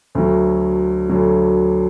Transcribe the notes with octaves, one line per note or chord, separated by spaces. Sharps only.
D2 D3 F#3
D2 D3 F#3